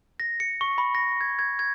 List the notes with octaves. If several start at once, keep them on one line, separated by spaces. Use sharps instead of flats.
A#6
C#7
C#6
B5
A#6
G#6
G#6
G#6